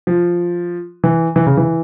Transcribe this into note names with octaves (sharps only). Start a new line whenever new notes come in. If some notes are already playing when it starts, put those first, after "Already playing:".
F3
E3
E3
C#3
E3